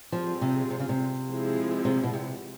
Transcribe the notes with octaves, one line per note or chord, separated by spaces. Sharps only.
F3 G3 C4 F4 G#4
C3
C3
C#3
C3
F3 G#3 C4 E4 G#4
C3
B2
C3